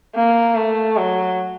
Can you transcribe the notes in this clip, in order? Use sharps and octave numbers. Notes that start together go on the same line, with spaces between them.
A#3
A3
F#3